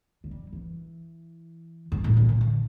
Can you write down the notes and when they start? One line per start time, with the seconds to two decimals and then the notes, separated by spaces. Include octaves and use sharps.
0.24 F3
0.31 G3
0.53 E3
1.92 G2
2.04 A2
2.17 A#2
2.29 C3
2.41 D3